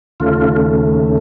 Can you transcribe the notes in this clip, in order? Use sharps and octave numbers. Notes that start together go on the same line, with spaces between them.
D#2 C#3 A3 F4